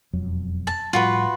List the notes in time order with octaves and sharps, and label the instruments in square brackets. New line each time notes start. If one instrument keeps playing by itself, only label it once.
[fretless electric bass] E1 F2 F#3
[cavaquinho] A5
[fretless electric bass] A2 F3 G3 [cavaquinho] F4 F#4 B4